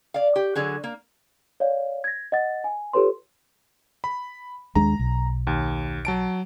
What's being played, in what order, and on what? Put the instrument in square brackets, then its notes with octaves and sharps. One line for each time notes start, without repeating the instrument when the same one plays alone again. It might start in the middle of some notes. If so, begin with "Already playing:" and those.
[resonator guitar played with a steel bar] D5 F5
G4
D3 F#3 G#4
A#3
[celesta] C#5 D5 F5
G#6 A#6
D#5 F#5 A6
G#5
F4 G4 A4 B4 C#5 C6
[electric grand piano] B5
[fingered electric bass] D#2 G#3 D4 [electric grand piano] A#5
[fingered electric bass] B1
[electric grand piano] D#2
F#3 A5 D7